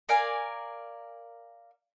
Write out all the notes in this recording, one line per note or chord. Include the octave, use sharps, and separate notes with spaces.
A#4 D5 F5 G#5